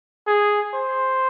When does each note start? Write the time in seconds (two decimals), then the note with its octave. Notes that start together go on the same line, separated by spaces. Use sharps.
0.27 G#4
0.75 C5